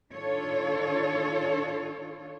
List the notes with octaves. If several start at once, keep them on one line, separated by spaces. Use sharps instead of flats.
D#3 D4 F4 A4 C#5